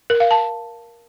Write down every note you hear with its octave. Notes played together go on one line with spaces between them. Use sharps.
A#4
F5
A5